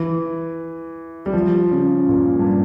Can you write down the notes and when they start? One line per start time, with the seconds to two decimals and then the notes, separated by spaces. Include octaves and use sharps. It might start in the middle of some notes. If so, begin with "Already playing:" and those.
Already playing: E3
1.26 G3
1.33 F3
1.71 C#3
2.09 A#2
2.39 G2